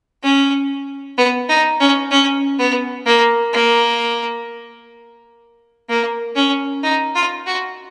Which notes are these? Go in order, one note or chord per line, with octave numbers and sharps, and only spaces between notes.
C#4
B3
D#4
C#4
C#4
B3
A#3
A#3
A#3
C#4
D#4
F4
F#4